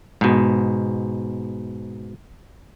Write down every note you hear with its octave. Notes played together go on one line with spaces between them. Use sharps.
G#2 B2